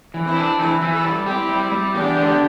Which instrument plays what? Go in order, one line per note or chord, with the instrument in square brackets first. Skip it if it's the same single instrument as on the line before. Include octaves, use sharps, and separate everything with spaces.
[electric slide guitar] E3
[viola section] C4 E4
[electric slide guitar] D4
[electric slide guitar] E3 [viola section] C4 E4
[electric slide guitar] E3
[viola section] E4 A4
[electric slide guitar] G3
[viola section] C4 E4 [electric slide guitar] G4
[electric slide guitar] G3
G3
[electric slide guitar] E2 [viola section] D4 G4
[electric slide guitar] D3